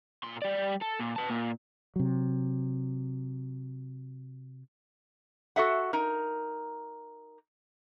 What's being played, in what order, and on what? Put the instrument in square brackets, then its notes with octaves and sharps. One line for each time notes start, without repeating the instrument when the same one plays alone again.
[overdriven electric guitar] A#2 C6
G3 D5
A4
A#2
B4 A5
A#2
[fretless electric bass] C3 F#3
[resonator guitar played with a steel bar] F#4 A4 E5 F#5
D#4 A#4